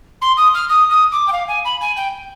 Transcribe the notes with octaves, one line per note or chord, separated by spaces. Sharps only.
C6
D#6
F6
D#6
D#6
D6
G5
F5
G#5
B5
G#5
G5